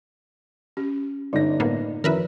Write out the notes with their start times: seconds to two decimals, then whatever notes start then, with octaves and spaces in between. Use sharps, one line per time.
0.77 C#4 G4
1.33 G1 D3 D#4 D5 D#5 A#6
1.60 A2 A#3 B3
2.04 F#2 D#3 F3 C#4 E4 A#4 B4 E5